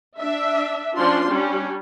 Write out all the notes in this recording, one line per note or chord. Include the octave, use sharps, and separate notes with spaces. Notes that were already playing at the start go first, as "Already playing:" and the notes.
D4 E5
F3 C#4 D4 F4 C6
G3 C#4 D4